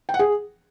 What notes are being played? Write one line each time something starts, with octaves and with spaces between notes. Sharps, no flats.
G5
F#5
G#4